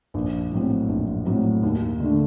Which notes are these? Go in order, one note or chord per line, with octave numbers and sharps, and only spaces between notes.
A#1
A2 F#3 C4
A#1
A2 F#3 C4
D#2
D3 A3 D4